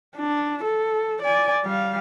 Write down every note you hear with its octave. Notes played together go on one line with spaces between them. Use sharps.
D4
A4
D5 G#5
G3 F5